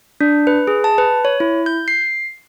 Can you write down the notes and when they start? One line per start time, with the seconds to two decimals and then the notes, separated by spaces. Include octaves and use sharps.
0.21 D4
0.47 B4
0.67 G#4
0.84 A5
0.98 B4
1.25 C#5
1.40 E4
1.66 G6
1.88 C7